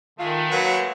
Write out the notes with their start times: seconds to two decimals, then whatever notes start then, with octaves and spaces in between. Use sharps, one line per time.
0.19 D#3 G#3 A3 F4
0.51 F#3 A#3 B4 F#5